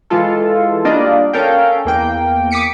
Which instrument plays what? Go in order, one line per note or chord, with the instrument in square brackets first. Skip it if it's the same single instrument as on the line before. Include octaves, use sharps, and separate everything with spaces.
[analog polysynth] E3 G#3 F4 A4
G3 A#3 D4 F4 D5 D#5
C#4 A4 A#4 F5 G5
E2 A#3 G5
D6 D#6 B6 C#7 D7